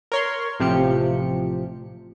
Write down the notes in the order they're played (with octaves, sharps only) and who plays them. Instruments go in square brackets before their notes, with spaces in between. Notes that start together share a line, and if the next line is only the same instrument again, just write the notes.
[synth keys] A#4 C#5 C6
A1 C3 F3 G4 C#7